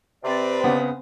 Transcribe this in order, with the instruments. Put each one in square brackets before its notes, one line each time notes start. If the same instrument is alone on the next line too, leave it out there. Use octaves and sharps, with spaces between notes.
[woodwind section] C3 D5 [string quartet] C4 B4
[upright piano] C#3 B3